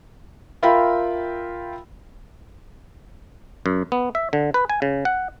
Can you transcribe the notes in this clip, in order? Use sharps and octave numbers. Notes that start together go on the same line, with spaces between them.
F4 A#4 E5 F5 G5 B5
F#2
B3
E5
D3
B4
G#5
C#3
F#5